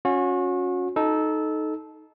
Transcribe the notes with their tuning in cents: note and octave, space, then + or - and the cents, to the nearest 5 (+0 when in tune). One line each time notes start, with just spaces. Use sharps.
C#4 +0 F#4 -35
D#4 +0 A4 -15